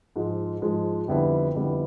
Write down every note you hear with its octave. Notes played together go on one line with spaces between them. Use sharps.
G#2 F3 G#3
G#2 F3 G#3
F2 D3 G3 B3 E4
F2 D3 G3 B3 E4